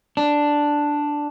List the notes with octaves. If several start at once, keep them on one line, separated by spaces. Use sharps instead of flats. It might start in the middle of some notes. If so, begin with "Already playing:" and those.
D4